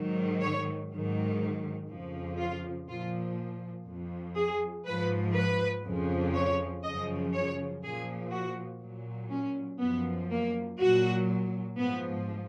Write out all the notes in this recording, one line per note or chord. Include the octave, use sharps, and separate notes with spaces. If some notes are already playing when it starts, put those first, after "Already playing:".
Already playing: G#2 D#3 F#3
C#5
G#2 D#3 F#3
F2 C#3 F3
F4
A#2 F3 F4
F2 F3
G#4
G#2 F3 B4
B4
F2 C#3 F3
C#5
F#2 C#3 F3 D#5
C#5
A#2 F3 G#4
F#4
A#2 F#3
C#4
F#2 F3 B3
A#3
A#2 F#3 F#4
G#2 F3 B3